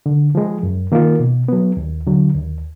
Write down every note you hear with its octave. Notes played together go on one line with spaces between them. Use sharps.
D3
F3 G#3
F#2
D#3 A#3 F4
B2
F#3 B3
D#2
D3 F#3
D#2